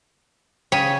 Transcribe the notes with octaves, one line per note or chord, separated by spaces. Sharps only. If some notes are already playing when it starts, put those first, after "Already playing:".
C#3 C#5 G5 B6 D#7